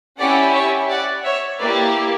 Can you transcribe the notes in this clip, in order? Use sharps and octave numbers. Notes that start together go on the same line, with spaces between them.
C#4 E4 G4 D5 F#5
C#5 E5
D5 F#5
C#5 E5
A#3 E4 G4 B4 D5